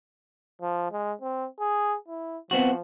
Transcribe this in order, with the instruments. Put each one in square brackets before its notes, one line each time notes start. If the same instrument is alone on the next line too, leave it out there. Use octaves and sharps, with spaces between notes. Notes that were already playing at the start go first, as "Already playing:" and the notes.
[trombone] F3
G#3
C4
G#4
E4
[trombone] F3 [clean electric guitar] B3 C4 F#4